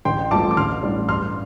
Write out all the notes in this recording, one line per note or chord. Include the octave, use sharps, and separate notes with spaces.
A1 G5 C6
G2 F3 A3 A5 D6
D6
A1 C6 F6
A2 G3 D4
G2 C6 F6